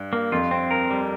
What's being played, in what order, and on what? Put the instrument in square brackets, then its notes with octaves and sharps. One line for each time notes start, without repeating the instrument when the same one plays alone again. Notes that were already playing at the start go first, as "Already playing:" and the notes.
Already playing: [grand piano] G2
[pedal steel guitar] A#3
[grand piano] F2 [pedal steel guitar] F4
[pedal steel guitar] C4
A#4
G3